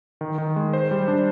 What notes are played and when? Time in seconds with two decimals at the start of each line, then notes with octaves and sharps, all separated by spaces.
0.21 D#3
0.38 D#3
0.56 G#3
0.73 C5
0.91 G3
1.08 D4